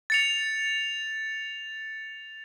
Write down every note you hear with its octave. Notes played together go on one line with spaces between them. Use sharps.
A6 C#7 F7